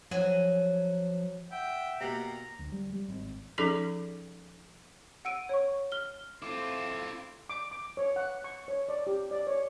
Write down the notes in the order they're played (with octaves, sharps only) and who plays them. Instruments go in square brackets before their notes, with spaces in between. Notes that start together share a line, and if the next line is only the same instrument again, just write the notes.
[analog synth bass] F3 [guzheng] F#3 G#5
[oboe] E5 [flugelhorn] F#5 [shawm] G5
[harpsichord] B2 A#3 F#5 [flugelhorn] G4 [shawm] A#5
[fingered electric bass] D2
G3
G3
G#1
[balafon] F3 C#4 D#4 G#4 A4 D6
[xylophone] F#5 E6 D7 D#7
C#5 C#6
F6 G7
[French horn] A3 [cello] C4 [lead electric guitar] E4 F4 [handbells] D6
[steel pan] D6
D6
C#5
F#5
C#6
C#5
D5
G4
D5
C#5